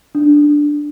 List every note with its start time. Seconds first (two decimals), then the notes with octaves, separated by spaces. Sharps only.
0.15 D4